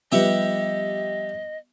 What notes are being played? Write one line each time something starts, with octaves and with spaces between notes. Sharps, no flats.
F3 G3 B3 G4 D#5 E5 F#5